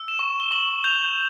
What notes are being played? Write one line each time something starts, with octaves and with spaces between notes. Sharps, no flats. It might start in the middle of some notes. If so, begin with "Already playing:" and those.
Already playing: E6
E7
C#6
G7
C#6 F#7
G6 F7